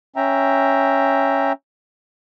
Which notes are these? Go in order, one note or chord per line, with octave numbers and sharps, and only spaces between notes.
C#4 E5 G5 A#5